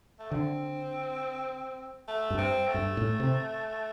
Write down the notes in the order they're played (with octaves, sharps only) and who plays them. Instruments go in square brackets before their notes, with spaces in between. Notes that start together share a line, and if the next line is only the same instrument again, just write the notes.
[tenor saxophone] A3
[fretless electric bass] D3 [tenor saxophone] C4
[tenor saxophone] A3
[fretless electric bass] G2
[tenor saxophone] C4
A3
[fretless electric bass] G2
A2
C3